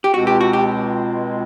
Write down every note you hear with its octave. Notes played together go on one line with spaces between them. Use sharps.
G4
C#2 B2 G#3 C4 F#4
G4
F#4
G4